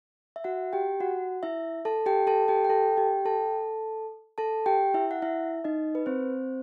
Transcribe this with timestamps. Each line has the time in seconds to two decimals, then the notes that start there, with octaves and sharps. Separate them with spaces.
0.36 E5
0.44 F#4 F#5
0.73 G4 G5
1.00 F#4 F#5
1.43 E4 E5
1.85 A4 A5
2.06 G4 G5
2.27 A4 A5
2.48 G4 G5
2.64 G5
2.70 A4 A5
2.97 G4 G5
3.19 G5
3.25 A4 A5
4.38 A4 A5
4.66 G4 G5
4.94 E4 E5
5.11 F#5
5.22 E4 E5
5.64 D#4 D#5
5.95 B4
6.06 C4 C5